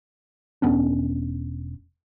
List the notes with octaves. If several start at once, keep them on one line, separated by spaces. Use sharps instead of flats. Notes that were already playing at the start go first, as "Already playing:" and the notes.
E1 B3 C#4 D4